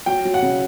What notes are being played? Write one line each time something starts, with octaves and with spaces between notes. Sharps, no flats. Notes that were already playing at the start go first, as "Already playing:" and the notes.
F#3 G5
F#3
F#5
C#3